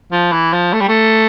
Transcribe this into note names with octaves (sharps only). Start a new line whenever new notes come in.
F3
E3
F3
A3
G3
A3